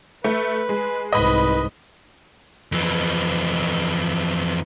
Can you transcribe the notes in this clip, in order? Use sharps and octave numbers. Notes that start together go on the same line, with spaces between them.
A3 B4
G#3
C2 G#2 B4 D#5 B5
F2 E3